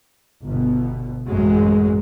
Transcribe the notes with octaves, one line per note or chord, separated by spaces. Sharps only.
G1 B2
A1 F#2 F#3 G#3